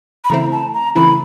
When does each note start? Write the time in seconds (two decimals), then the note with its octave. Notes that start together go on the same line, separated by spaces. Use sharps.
0.24 B5
0.30 C#3 E3 A3 C4 E4 A#5
0.52 A5
0.74 A#5
0.95 C#3 E3 A3 C4 E4 B5